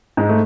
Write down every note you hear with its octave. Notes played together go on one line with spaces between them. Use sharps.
G#2 G#3
A3